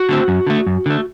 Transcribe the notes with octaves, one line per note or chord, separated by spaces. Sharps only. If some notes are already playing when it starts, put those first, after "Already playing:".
Already playing: F#4
D3 A3 C4
F#2
D3 A3
F#2
D3 A3